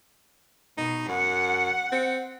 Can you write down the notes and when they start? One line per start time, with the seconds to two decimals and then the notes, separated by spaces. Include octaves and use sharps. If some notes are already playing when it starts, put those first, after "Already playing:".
0.78 B2 D#4
1.08 F#2 F#5
1.92 C4